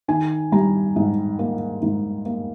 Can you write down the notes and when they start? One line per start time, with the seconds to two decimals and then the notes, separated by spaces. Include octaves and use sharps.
0.08 D#3 G#5
0.52 G3 A#5
0.96 G#2
1.39 A#3
1.82 G#2
2.26 A#3